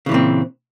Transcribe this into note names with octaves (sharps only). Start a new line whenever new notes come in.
A#2 C#3 E3 C4